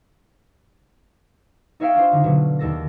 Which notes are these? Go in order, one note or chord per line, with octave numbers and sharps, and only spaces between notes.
D#4 C#5 E5 F5 G5
D4 F4 C5
D3 D#4
B2 D3 F#3
D#2 A4 A#6